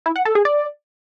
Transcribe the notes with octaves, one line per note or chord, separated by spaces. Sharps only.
E4
F#5
A4
G#4
D5